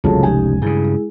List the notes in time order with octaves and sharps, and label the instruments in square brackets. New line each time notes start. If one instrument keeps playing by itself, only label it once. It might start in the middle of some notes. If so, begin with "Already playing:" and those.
[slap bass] F1 C#2 [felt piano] C#3 F3 F#3 [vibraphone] A4 A5
[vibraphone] C#4 D#4 G4 [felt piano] G#5
[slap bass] G2 C#3 [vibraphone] G#3 E4 G#4